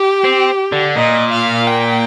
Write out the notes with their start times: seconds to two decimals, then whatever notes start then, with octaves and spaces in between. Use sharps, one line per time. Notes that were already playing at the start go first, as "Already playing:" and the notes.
Already playing: G4
0.24 C4
0.73 D3
0.96 A#2 D#5
1.32 F5
1.67 G5